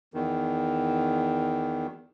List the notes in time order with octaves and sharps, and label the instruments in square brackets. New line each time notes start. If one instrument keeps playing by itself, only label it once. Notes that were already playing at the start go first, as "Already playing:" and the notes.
[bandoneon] E2 D#3